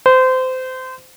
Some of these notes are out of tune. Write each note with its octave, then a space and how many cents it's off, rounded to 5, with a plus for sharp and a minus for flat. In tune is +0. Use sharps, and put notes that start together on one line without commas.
C5 -25